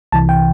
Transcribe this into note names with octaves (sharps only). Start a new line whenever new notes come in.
C2 C3 E3 A5
G5